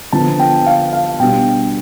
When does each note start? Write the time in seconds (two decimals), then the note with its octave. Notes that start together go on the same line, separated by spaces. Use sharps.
0.12 D3 F3 B3 A5
0.39 G5
0.66 F5
0.93 F5
1.19 B2 G3 D4 G5